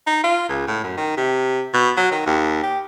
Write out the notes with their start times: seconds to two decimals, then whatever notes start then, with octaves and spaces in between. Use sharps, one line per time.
0.07 D#4
0.24 F4
0.49 C#2
0.68 A2
0.84 F#2
0.97 D#3
1.17 C3
1.74 B2
1.97 F#3
2.11 D#3
2.26 D#2
2.63 G4